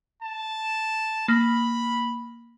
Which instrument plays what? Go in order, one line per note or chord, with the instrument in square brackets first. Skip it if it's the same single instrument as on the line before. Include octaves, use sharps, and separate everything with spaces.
[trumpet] A5
[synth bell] A#3 [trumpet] B5